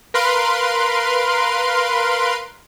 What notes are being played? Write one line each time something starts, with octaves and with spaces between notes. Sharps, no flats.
A#4 B4 F5 C6 D7